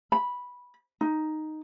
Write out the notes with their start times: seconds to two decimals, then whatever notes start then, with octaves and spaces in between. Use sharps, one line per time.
0.12 B5
1.01 D#4